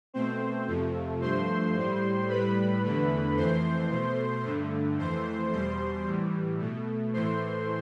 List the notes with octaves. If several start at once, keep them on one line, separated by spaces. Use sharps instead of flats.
B2 A3 C4 C5
F2 C3 F3 A3
G2 F3 A3 C5 C6
A2 G3
A2 G3 B4 B5
E2 D3 A3
F2 E3 A3 C5 C6
B2 A3
G2 D3 A3
F2 E3 A3 C5 C6
E2 B2 G3 C5 C6
A2 E3 G3
B2 A3
A2 E3 A3 C5 C6